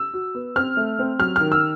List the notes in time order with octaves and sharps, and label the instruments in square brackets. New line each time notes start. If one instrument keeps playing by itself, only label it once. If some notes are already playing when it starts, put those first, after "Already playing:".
Already playing: [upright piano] E6
[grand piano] F#4
B3
[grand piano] C4 [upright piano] F6
[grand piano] A3
C4
[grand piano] F#3 [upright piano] F6
[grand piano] D#3 [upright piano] F6
[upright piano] E6